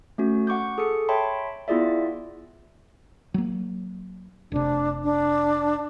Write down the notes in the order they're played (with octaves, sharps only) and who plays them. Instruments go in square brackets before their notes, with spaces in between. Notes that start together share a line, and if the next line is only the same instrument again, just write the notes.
[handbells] A3 C#4 F#4
F#5 C#6 D6 G6
G#4 A4 C#7
C#5 E5 G5 A5 B5 C6
B3 E4 F4 G#4 D5 E5
[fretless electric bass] F#3 A#3
[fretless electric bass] F1 C3 [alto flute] D4
[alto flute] D4